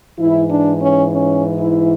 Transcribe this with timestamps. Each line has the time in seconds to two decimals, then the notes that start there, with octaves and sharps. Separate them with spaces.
0.19 G#2 E3 E4
0.50 D4
0.82 C#4
1.12 C#4
1.60 E4